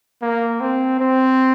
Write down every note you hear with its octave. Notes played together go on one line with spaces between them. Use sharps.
A#3
C4
C4